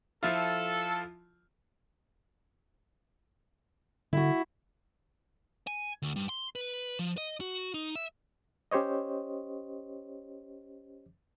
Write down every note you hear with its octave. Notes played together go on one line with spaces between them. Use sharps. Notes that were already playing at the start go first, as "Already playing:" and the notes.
F3 E4 F4 A4
D3 E4 F#4
G#5
D2
G2
C6
B4
F3
D#5
F#4
D#4
E5
C#4 G4 C5 C#5 D#5